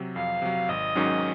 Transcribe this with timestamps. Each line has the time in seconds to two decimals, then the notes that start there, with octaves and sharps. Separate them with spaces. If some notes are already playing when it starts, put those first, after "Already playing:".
Already playing: C3 F#3
0.16 F2 F5
0.42 C3 F#3
0.69 G#1 D#5
0.96 G#2 D#3 F#3 C#4